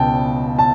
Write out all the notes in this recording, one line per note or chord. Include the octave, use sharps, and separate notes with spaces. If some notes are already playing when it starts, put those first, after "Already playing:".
Already playing: C#2 B2 G5 A5
A5